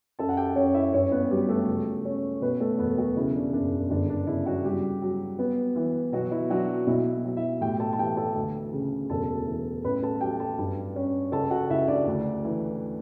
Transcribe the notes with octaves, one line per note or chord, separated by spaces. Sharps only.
F#2 A4 A5
F#5
G4 G5
F#2 C#4 C#5
E4 E5
G2 C#4 C#5
B3 B4
F#3 G3 G4
A3 A4
C#2
C#4
B2 B3 B4
A3 A4
E1 B3 B4
F#3 F#4
C#3 E4
D4
F#1 D4
G1 D4
D4
C#3 E4
F#3 F#4
F#3 G3 G4
F#3
B3
E3
B2 F#3 F#4
E4
F#3 D4 F#4
B1 E4
F#3
E4 E5
A2 G4 G5
A4 A5
A5
E3 G4 G5
A4 A5
D2
C#3
E1 A4 A5
E3
A1 B4 B5
A4 A5
F#3 G4 G5
A4 A5
G2
C#4
C#2 A4 A5
F#4 F#5
C#2 E4 E5
D4 D5
D2
E3